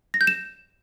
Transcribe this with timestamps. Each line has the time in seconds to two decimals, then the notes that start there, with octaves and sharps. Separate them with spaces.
0.14 A#6
0.21 G6
0.27 E7